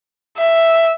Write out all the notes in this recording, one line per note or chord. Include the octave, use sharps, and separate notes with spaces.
E5